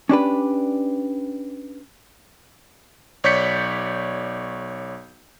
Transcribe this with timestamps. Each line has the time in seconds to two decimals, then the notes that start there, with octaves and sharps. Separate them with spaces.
0.09 C#4 D4 G4 B4
3.24 B1 C#5 D5 G6 B6 C#7